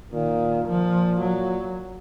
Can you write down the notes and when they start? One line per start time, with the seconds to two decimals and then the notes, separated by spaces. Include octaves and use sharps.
0.12 A#2 D#3
0.66 A#2 F3
1.20 F#3